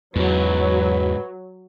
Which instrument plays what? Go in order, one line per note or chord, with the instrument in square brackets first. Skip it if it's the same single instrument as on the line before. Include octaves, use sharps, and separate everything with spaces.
[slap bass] E2 [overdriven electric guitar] G#2 C#3 [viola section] F#3 [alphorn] B4